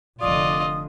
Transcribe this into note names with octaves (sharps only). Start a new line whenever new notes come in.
F1 D3 F4 D5 D#5 D#6